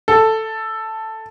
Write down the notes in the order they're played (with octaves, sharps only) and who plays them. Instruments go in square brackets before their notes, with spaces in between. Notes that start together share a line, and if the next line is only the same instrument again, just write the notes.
[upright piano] A4